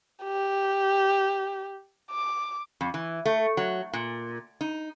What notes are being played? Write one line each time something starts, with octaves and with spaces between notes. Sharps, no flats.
G4
D6
F2
E3
A3
F#3
A#2
D#4